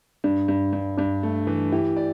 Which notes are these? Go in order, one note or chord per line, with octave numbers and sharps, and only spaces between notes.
G2 D4
G2
G2
G2 D4
A3
E3
E4 G4
D5